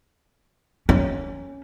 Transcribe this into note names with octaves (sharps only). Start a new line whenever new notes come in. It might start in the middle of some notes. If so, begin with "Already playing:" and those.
C#4